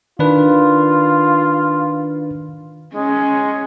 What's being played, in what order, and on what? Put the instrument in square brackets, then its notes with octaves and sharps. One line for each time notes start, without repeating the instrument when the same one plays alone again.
[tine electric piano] D#3 D4 B4 [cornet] F4
[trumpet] G#3 [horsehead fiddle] C#4